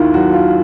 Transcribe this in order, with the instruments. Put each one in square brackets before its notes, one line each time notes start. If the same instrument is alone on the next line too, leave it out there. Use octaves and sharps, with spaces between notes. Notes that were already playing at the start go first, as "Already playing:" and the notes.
Already playing: [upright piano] D#2 D#3 [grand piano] E4 F4
[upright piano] F#3 [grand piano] F#4
[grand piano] F4